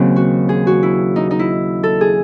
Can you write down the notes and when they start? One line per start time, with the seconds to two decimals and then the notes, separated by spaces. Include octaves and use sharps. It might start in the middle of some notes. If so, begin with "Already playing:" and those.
Already playing: D#2 C#3 F#3 C4
0.16 F#4
0.49 G#4
0.67 F#4
0.83 E4
1.16 D#4
1.31 D#4
1.39 E4
1.83 A4
2.01 G#4